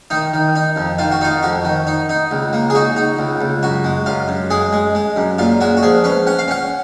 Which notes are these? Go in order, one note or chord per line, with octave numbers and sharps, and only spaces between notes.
D#3 D#4
D#3
D#4
F2
D#3 F4
F#4
D#4 F4
F2 F#4
D#3
D#4
D#4
C#2
A#3
G#4
D#4 F#4
D#4
C#2
C#2
F#2 F#4
G#3
F#2 F4
F#2
G#3 G#4
G#3
G#3
F#2
A#2 F4
G#3 F#4
F#4
F3 G#4
C#4 B4
C#4 F#5
F5
C#4 F#5